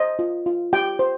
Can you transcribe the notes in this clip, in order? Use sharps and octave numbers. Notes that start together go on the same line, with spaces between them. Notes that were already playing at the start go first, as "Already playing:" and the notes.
Already playing: C5 D#5
F4
F4
G4 G5
C5